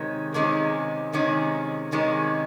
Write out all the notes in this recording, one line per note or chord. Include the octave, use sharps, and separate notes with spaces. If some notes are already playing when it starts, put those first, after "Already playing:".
Already playing: C3 D#3 G#3 C#4
C3 D#3 G#3 C#4
C3 D#3 G#3 C#4
C3 D#3 G#3 C#4